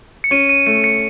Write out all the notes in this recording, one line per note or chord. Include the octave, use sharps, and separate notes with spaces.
C#7
C#4 D#7
D#7
A3 D#7
C#7